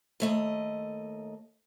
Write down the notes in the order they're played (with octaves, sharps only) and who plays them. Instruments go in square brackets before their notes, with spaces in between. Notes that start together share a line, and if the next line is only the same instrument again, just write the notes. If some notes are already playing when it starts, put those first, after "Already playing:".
[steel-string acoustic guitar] D#2 A3 D#5